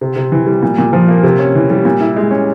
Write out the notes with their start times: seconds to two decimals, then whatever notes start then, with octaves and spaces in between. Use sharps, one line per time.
0.01 C3
0.16 C3
0.32 E3
0.47 G3
0.63 A#2
0.78 A#2
0.93 F3
1.08 A#3
1.23 C3
1.39 C#4
1.55 E3
1.70 G3
1.85 A#2
2.01 E4
2.16 G#3
2.31 C#4